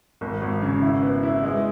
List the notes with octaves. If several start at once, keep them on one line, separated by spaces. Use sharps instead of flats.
G#1
G#1
C#3
E4
B3
E4
G#3